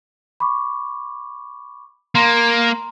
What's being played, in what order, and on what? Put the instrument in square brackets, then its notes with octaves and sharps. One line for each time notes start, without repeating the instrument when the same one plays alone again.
[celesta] B5 C#6 D6
[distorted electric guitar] A#3 [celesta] A#5 C6